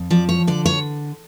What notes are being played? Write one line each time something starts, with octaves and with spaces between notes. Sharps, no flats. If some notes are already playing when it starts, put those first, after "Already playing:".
Already playing: F2
F3 D5
C#5
D3 D5
C#5